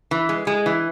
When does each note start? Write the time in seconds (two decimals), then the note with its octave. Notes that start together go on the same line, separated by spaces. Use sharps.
0.11 E3
0.29 G#3
0.47 G#3
0.66 E3